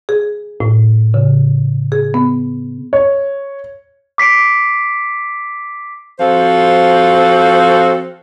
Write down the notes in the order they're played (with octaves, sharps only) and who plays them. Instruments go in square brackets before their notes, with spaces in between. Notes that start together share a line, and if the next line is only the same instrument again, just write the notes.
[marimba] G#4
A2
C#3
G#4
B3
[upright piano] C#5
[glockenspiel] D6 B6 C7 D7
[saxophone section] F3 C4 F#4 A4 C5